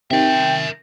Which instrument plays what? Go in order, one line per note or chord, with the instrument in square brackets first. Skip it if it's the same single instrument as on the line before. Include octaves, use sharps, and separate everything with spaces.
[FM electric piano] C3 D#3 [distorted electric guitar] A#4 E5 [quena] G5